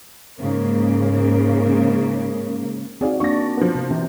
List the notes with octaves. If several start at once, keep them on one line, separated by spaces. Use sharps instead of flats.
G#2 C#3 A#3
C4 D#4 F#4 G#4 D5 F5
A#3 D4 D5 C#6 A#6
F3 B3
C3 C5
C3 E3